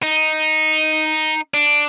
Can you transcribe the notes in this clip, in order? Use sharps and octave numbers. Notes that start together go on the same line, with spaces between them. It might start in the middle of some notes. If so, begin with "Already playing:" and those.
D#4
D4